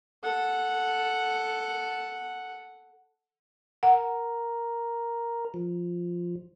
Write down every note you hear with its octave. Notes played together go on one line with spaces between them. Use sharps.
A4 F#5
A#4 F#5
F3